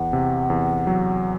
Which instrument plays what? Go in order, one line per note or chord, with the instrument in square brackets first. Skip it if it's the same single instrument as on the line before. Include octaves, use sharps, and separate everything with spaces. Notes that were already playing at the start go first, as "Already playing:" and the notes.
Already playing: [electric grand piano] E2 [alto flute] F#5
[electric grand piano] C3
E2
F#3